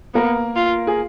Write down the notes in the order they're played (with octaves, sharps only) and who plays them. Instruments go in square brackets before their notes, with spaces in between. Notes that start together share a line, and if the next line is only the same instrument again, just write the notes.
[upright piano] A#3 A#4 [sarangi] B3
[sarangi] F4
[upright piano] G#4